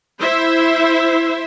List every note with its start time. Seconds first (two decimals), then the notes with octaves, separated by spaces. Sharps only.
0.20 E4 C5 E5